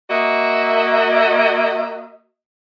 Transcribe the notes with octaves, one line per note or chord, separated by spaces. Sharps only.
A#3 F#4 D#5 E5